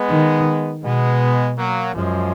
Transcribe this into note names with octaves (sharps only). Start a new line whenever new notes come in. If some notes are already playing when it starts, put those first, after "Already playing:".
Already playing: G#3 B3
D#3
B2 G#3 B3
F#3 A#3
F#2 F3 G#3